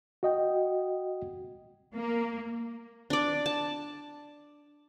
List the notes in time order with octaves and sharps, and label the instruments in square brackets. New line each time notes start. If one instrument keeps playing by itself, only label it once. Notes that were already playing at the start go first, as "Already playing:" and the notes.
[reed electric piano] F#4 D#5 G5
[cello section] A#3
[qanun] D4 D5
A5